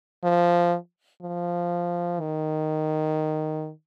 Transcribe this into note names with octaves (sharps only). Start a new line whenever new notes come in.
F3
F3
D#3